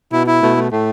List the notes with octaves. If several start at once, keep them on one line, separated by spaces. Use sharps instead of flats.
B2 E4
E4
B2 A3
A3
A2 A3